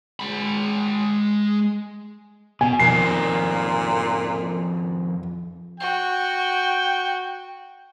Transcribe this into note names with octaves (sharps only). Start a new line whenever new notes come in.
G#3 B5
B2 G#5
F2 A#2 D#3 C7
F#4 G5